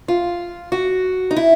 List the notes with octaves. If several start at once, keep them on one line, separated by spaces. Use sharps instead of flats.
F4
F#4
D#4
E4